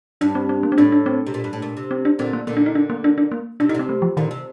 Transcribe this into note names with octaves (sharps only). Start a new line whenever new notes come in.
G2 D4
C4
C4
A#3
C4
A2 D4
D4
C4
C3
A#2
G2
A2
A#2
C3
C4
D4
A#2 D3 C4
A#3
A#2 D3 A#3
D4
D#4
D4
A#3
D4
D4
A#3
C3 D4
D3 D#4
C3 C4
A3
F3
A#2 D3 D#3
C3